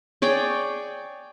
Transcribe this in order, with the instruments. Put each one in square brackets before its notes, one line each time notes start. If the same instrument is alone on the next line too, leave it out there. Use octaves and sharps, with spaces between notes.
[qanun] G#4 C#5 D5 G5